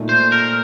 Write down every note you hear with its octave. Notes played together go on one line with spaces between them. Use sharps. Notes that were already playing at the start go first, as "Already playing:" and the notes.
Already playing: A#2 A3 D#4
C5
A#4